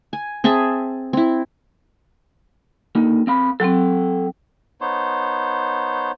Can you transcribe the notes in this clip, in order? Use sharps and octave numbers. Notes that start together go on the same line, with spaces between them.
G#5
C4 G#4 E5 A5
C4 E4
D3 A#3 D#4
C4 F5 B5
F#3 C4 A4 F#5 G5
B3 D#4 C5 C#5